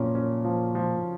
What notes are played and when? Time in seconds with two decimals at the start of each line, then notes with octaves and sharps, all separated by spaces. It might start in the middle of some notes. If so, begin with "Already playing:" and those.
Already playing: F#2 A#2 F3 C#4
0.15 C#4
0.45 F3
0.75 F3